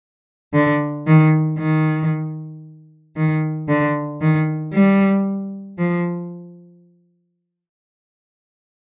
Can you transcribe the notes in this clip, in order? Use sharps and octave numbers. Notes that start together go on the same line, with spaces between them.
D3
D#3
D#3
D#3
D3
D#3
G3
F3